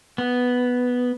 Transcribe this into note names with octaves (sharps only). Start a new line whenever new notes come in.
B3